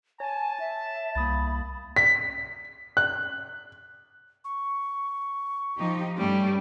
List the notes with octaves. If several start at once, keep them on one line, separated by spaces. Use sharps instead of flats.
C#5 G#5 A5
E5
C2 A#3 B5 D#6 A6
B6
F#6
C#6
F3 D#4 G4
G2 G3 A3 C#4